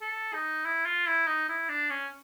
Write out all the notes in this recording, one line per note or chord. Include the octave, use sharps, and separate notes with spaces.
A4
D#4
E4
F4
E4
D#4
E4
D4
C#4